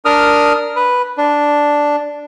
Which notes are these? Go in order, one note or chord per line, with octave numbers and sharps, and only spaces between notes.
D4 A#4 D#6 F6
B4
D4